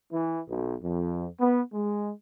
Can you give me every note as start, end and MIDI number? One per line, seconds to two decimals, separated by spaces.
0.11 0.40 52
0.48 0.75 35
0.82 1.27 41
1.39 1.61 59
1.72 2.11 56